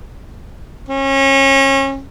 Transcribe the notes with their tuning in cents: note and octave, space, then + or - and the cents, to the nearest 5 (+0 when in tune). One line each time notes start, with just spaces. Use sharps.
C#4 -30